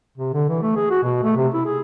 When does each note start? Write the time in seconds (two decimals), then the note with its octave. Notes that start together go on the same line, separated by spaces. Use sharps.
0.18 C3
0.34 D3
0.49 E3
0.62 A3
0.76 G#4
0.90 F#4
1.03 B2
1.23 A3
1.36 C3
1.54 E4
1.65 G#4